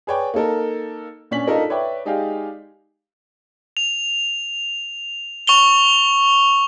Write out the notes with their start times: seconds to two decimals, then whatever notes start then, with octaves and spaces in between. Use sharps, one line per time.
0.07 G#4 B4 C#5 D5 G5
0.34 A#3 D#4 A4 A#4
1.31 A#2 C#4 D4 B6 F#7
1.47 D4 D#4 F4 A4 A#4 D#5
1.70 B4 C#5 D5 E5 G5
2.05 G#3 D#4 G4 G#4 D5 F5
3.77 F7
5.47 C#6 F7 G7